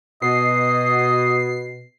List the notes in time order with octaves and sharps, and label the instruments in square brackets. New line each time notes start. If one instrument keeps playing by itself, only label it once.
[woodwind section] B2 [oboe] D#5 [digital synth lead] C7